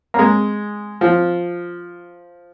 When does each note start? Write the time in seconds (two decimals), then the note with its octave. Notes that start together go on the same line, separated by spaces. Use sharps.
0.14 A#3
0.19 G#3
1.01 F3